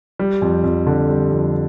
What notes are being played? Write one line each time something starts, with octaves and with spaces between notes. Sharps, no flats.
G3
F2
F2
D3
G3
F2